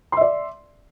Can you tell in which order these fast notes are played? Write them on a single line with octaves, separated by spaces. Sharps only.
C6 E5 D5